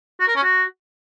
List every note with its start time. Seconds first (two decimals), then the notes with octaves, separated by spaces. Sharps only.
0.20 F#4
0.28 A#4
0.36 C#4
0.43 F#4